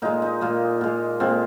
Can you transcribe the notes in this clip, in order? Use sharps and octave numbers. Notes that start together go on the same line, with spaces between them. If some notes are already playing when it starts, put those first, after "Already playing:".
A#2 G#3 D#4
D#4
A#2 G#3 A#3
A#2 G#3
A#2 G#3 C4